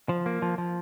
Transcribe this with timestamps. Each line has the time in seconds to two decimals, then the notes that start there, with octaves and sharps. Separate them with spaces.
0.09 F3
0.26 A#3
0.42 F3
0.58 F3